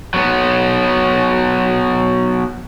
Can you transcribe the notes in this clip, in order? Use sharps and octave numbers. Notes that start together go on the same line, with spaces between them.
F#3 B3